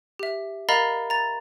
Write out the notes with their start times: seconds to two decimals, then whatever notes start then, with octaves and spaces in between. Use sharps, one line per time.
0.19 G4 E5
0.69 A#4 D#5 F5 A#5 B5 A6
1.10 A#5 A6